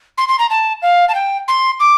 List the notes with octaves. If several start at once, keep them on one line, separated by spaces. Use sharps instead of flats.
C6
C6
A#5
A5
F5
A5
G5
C6
D6